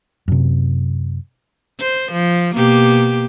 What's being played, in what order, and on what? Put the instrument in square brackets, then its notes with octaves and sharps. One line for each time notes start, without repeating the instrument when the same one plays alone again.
[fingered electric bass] F#2 C3
[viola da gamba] C5
F3
B2 A#3 G4